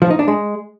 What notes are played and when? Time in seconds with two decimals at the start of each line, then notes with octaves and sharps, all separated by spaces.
0.02 F3
0.10 D#4
0.19 D4
0.28 G#3